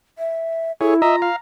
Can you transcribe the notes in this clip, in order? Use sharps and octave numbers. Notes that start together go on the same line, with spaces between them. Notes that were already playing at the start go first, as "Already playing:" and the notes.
E5
E4 G#4 A4 C#5
F4 D#5 E5 A#5
F5